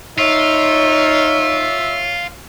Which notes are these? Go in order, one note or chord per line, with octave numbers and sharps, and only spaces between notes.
D#4 F4 C#5 E5